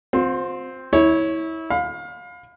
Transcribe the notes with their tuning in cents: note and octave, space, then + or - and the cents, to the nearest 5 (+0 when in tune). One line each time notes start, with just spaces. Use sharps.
C4 +0 F4 +40
E4 -25 C#5 +0
F5 +30 B5 +25